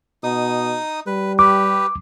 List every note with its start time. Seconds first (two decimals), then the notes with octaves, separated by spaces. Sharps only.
0.23 B2 D#4 D#6
1.07 G3 B4
1.39 G4 B4 D6